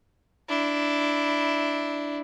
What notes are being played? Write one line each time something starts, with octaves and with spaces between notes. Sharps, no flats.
D4 E4